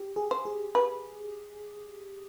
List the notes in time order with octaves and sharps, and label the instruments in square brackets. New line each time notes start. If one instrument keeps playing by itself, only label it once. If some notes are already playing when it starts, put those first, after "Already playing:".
Already playing: [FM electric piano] G4
G#4
[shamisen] C5
[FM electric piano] G#4
[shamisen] B4